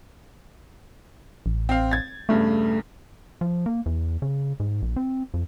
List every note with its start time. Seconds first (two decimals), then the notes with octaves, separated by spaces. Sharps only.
1.46 A1
1.69 C4 F5
1.91 G#6 A6
2.29 E2 G2 C#3 A3
3.41 F3
3.66 A#3
3.86 E2
4.22 C#3
4.60 G#2
4.82 A#1
4.96 C4
5.34 F2